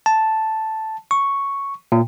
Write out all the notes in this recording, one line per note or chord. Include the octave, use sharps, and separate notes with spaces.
A5
C#6
A#2